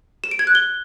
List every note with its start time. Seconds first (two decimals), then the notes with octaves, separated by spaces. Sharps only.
0.24 E7
0.31 D7
0.39 G#6
0.47 F#6
0.55 G7